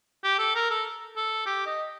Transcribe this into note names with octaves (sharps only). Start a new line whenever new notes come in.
G4
A4
A#4
A4
A4
G4
D#5